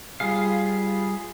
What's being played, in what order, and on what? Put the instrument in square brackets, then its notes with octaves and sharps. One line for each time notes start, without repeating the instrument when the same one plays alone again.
[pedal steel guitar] G3 F4 G#4 F5